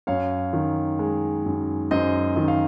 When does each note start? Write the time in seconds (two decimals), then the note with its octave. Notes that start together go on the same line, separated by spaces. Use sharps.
0.07 F#2 C#5 F5
0.53 D#3
0.99 G#3
1.45 F#2
1.91 F#2 C5 D#5
2.36 D#3 D#5
2.48 F5